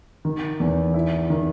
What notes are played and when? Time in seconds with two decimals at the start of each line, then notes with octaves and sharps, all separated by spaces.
0.25 D#3
0.60 E2
0.94 E4
1.30 D#3